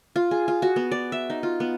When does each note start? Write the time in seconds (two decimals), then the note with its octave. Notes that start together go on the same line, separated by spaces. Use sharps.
0.16 F4
0.31 G#4
0.48 F4
0.62 F#4
0.76 B3
0.92 D5
1.12 E5
1.30 D#4
1.43 F4
1.60 B3